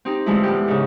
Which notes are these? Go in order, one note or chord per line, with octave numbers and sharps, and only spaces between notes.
C4 D#4 G4
D3 E3 F3 G#3 A3 E4
A2 E3 B3 G4
G#2 C#3